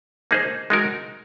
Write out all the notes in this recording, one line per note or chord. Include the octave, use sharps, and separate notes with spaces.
A#3 D#4 G#4 C5
G#3 D#4 F#4 A#4